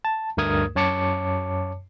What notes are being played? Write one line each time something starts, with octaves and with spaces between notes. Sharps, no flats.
A5
D2 G2 A3 A#4 D#6 G#6
F#2 C#5 A5 D6 C#7